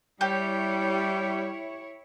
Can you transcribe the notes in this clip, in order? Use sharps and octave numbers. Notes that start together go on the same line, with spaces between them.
G3 E4 G4 C#5